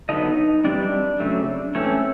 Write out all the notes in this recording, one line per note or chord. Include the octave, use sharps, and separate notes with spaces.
D3 F#3 B3 D#4 D#5
E3 G3 C4 D4 D5
C#3 F#3 A3 C4
E3 A3 C4 C#4 C#5